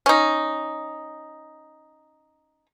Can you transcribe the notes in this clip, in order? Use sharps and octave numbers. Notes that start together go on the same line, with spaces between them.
C#4 D#4